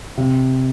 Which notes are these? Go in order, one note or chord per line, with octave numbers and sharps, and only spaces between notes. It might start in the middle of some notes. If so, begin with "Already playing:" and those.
C3